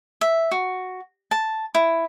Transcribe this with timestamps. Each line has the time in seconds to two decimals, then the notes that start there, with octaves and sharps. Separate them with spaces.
0.21 E5
0.51 F#4
1.31 A5
1.75 E4